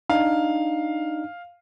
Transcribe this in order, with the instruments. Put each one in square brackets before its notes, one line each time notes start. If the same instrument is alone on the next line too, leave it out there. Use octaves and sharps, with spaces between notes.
[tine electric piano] D4 D#4 [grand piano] F5